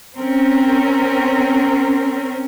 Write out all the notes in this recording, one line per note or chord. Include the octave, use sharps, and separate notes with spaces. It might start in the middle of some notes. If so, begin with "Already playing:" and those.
C4 C#4 A#4